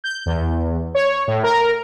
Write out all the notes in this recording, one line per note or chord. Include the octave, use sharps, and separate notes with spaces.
G6
E2
C#5
A2
A#4